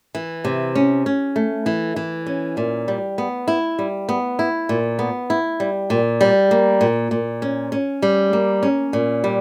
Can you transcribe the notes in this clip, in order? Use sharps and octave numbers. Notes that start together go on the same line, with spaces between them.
E3
C3
C#4
C#4
A3
E3
E3
C#4
A#2
G3
B3
E4
G3
B3
E4
A#2
B3
E4
G3
A#2
G3
A#3
A#2
A#2
C#4
C#4
G3
A#3
C#4
A#2
G3